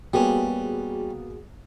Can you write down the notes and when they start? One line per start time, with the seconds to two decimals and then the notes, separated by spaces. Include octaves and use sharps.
0.14 G3 A#3 B3 C#4 F#4 G#4